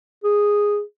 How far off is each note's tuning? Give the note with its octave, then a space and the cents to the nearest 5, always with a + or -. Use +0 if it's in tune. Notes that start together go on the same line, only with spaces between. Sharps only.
G#4 -10